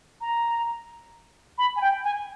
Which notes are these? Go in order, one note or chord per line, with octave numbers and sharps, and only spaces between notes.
A#5
B5
G#5
G5
G#5